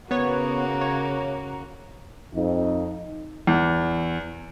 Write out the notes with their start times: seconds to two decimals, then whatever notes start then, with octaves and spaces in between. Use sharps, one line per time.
0.11 C#3 A#3 B3 F#4 C#5
0.81 C#5
2.34 F2 D#4
3.47 E2